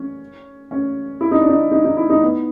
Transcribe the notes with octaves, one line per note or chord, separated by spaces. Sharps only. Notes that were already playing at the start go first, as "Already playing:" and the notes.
Already playing: C#4
C#4
E4
D#4
D4
D#4
D#4
D#4
E4
D#4
B3